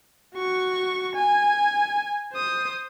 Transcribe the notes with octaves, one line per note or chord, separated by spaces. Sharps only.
F#4 C#6
G#5
C5 D#6